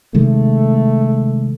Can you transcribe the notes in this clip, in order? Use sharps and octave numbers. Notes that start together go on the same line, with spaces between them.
C3 D#3 G#3 A3